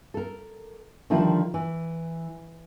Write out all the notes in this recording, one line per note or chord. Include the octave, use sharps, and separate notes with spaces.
A4 A#4
D3 D#3 F3 G3 E4 F4
E3